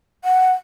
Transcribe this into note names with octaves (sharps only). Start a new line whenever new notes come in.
F#5